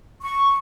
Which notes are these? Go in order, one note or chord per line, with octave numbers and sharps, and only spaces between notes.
C#6